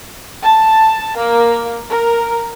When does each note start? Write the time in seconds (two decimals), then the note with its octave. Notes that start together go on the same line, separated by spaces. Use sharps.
0.43 A5
1.19 A#3
1.90 A#4